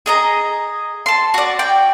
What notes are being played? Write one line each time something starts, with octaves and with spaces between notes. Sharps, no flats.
G#4 D#5 A#5
A5 C6
F#4 D5
D5 G5